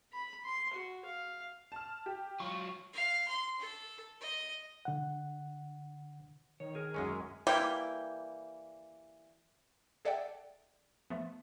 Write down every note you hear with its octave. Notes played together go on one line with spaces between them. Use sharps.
B5
C6
F#4
F5
A5 F6
G4
F#3 F4 C#6
F5
C6
A4
D#5
D3 F#5
D#3 C#5
G#4 A#4
F#2 G#3 C#4
E3 G3 A#3 G5
G#4 A4 D5 E5 F#5 G5
F3 A3 B3